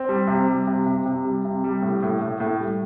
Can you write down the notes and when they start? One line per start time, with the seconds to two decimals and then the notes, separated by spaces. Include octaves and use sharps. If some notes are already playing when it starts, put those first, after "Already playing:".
Already playing: C4
0.09 G3
0.27 C3
0.48 G3
0.67 C3
0.86 C3
1.06 C3
1.25 G3
1.45 C3
1.64 G3
1.82 A2
2.03 A2
2.21 A2
2.40 A2
2.60 G3